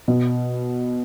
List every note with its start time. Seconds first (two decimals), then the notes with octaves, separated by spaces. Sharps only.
0.08 B2